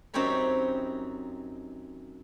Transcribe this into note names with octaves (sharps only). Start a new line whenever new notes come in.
F#2 C4 D#4 G4 C#5 B5